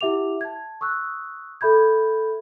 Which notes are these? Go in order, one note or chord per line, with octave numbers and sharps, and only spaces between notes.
E4 G4 E5 F#5 D6 F7
A5 G#6
C#6 D#6 E6 F#6
A4 E5 B5 G6 G#6